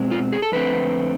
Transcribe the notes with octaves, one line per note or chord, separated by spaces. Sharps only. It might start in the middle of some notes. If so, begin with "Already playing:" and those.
Already playing: B2 G#3 C4
F4
G#4
A4
F2 D3 A3 C4 B4